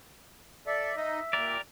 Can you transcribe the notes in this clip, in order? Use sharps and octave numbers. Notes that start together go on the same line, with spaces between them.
A4 D5 E5
D#4 D#5 E5
A#2 G4 A#4 D5